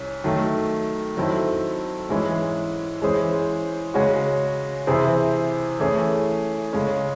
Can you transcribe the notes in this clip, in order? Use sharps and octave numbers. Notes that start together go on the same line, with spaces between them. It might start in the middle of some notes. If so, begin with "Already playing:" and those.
Already playing: C2 C#4
D#3 F#3 A3
D#3 F#3 C4 E4 A4
G#2 E3 G#3 C#4 E4
E3 G#3 C#4 G#4 C5
C#3 G#3 C#4 F#4
C3 E3 C4 E4 G#4
E3 A3 C#4 G#4
C#3 G#3 C#4